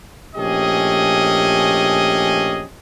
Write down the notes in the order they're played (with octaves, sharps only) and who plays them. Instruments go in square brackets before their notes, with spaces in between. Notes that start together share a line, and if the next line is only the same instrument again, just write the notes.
[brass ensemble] A#1 A3 C#4 G4 G#4 D#5